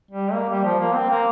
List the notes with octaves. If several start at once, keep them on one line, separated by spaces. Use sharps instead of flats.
G3
A#3
G3
F3
A#3
C4
A#3